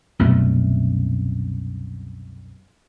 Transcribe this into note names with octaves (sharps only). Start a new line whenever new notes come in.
C2 F#2 B2 A3